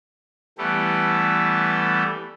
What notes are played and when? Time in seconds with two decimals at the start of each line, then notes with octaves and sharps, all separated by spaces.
0.58 E3 G3 A3 B3 G4 A4